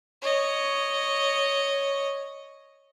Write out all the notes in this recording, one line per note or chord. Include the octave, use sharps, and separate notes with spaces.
C#5 D#5